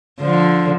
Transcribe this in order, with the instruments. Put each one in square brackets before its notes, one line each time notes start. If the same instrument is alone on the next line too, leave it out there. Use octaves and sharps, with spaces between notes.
[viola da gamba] D3 F3